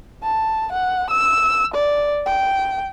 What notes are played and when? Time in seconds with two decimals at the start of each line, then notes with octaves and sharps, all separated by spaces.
0.23 A5
0.72 F#5
1.10 E6
1.74 D5
2.26 G5